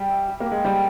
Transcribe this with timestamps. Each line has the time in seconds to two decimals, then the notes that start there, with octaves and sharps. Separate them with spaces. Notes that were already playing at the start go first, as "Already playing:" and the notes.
Already playing: G3 G4 G#4
0.09 E5
0.28 G4
0.40 A#3
0.46 G4
0.52 G#3
0.64 G3 C4